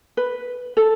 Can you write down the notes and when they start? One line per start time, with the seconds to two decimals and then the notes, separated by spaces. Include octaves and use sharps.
0.17 B4
0.77 A4